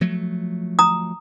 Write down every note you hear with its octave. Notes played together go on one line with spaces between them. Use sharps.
F3 F#3 A3
A#5 D#6